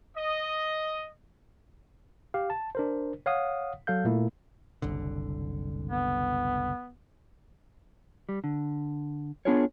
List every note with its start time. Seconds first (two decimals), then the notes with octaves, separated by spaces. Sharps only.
0.16 D#5
2.34 G4 F5
2.50 A5
2.75 D4 A#4 C5
3.26 C#5 F5 F#5 D#6
3.87 F#3 A4 F5 G6
4.04 A#2 A3 A#3 E4
4.82 F#1 C2 D3
5.90 B3
8.29 G3
8.44 D3
9.45 B3 D4 F4 G#4 A#4 C#5